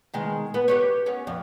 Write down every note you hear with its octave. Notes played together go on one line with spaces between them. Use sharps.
B2 D#3 G#3
B3 B4
G4 B4 C#5
B3 C#4 C#5
F2